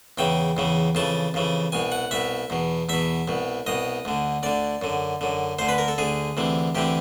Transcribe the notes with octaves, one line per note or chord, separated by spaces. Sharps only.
E2 C#3 E3 G5
E2 C#3 E3
F2 C#3 E3 A5
F2 C#3 E3
C2 B2 G#5
F#5
C2 B2 E5
E2 B2
E2 B2 E5
C2 B2
C2 B2 D#5
D2 D3
D2 D3 D5
F#2 D3
F#2 D3
D2 D3 C5
B4
A#4
A4
D2 D3 G#4
D2 C3 E3
D2 C3 E3 G4